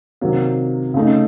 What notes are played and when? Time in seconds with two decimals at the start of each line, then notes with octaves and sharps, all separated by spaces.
0.21 C3 D#3 F#3 A#3
0.94 C#3 A3 D#4